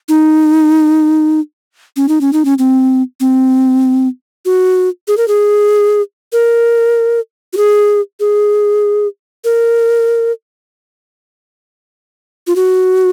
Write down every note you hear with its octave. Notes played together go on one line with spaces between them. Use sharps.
D#4
C#4
D#4
C#4
D#4
C#4
C4
C4
F#4
G#4
A#4
G#4
A#4
F#4
G#4
G#4
A#4
F4
F#4